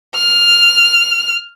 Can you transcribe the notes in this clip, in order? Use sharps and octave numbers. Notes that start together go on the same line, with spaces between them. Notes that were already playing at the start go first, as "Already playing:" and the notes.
F6